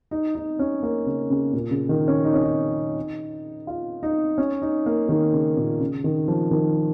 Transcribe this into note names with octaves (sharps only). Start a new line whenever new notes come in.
D#4
D#4
C#4
A#3
C#3
C#3
A#2
C#3
D#3
C#4
D#4
C#4
D#4
F4
D#4
C#4
D#4
A#3
D#3
C#3
A#2
C#3
D#3
F3
D#3